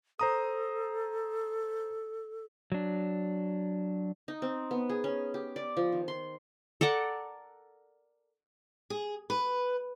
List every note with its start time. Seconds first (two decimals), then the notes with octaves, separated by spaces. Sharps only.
0.19 A4 C5 A#5 D#6
2.72 F#3 D4
4.28 D#4
4.42 C4
4.71 B3
4.89 G#4
5.04 C#4
5.34 G4
5.56 D5
5.77 F3
5.92 D#3
6.08 C6
6.81 A4 A#4 D5 F#5
8.90 G#4
9.30 B4